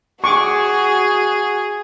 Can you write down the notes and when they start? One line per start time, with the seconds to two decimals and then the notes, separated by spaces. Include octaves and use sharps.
0.24 F#4 G#4 C#6 D6